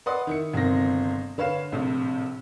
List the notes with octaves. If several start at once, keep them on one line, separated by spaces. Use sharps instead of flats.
B4 D5 D#5 F#5 C6 D#6
D#3 E4 C#7
G1 C3 D#3 C4 A#6
D3 B4 C#5 F5 E7
A#1 A2 C3